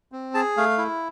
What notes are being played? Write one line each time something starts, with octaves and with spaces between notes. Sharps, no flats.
C4
G#4 A5
A3 F5
E4